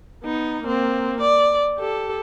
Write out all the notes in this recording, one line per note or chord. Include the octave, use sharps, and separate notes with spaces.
B3 D#4
A#3 C4
D5
G4 A4